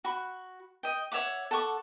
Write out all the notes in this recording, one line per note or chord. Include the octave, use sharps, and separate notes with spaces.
F#4 B5 C#6
D#5 G5
C#5 E5 F#5 D6
A4 F#5 C#6 D6